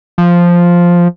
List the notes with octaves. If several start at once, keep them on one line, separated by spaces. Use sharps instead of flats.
F3